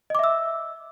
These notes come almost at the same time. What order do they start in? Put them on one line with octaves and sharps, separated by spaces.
D#5 D6 E5 E6